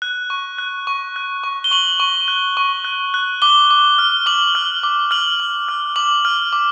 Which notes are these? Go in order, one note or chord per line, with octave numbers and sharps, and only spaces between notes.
F#6
C#6
F#6
C#6
F#6
C#6
G7
C#6 F#7
C#6
F#6
C#6
F#6
F#6
D6 G7
D6
F6
D6 F#7
F6
D6
F6 F#7
F6
F6
D6 F#7
F6
D6